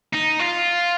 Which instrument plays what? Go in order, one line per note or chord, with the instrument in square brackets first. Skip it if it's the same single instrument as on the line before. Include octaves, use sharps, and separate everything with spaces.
[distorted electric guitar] D#4
F4